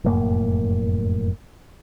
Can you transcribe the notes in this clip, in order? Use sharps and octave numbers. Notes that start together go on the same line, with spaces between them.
F1 F#2 A2 A#3